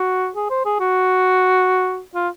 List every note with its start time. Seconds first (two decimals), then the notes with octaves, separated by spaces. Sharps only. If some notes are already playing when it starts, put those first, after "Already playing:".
Already playing: F#4
0.36 G#4
0.50 C5
0.66 G#4
0.80 F#4
2.15 F4